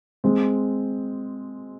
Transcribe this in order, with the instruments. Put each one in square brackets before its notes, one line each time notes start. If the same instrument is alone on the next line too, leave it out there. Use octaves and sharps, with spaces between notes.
[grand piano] G#3 C4